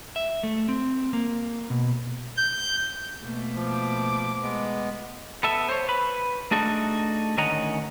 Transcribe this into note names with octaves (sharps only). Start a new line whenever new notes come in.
E5
A3
C4
A#3
B2
G6
B2 A3 A#3
F3 D6
G#3 B3
B3 A4 E5
C5 C#5
B4 B5
A3 D4 D#4 F#4 G#4 A4
D2 D#3 C#4 D#5 F#5 A#5